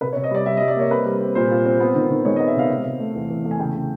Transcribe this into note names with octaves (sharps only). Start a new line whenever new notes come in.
C3 B4
C#5
C3
D#5
G3 D5
G3 E5
D#5
G3
D5
A#3 C#5
C4 B4
G3
C4
A#2 C5
F4
C4
B3
D#3
D#3
G#3 C#5
D#5
B3
E5
C3 F5
C3
C3
A3
E2
E2
A3
G#5
C#3 G5
C#3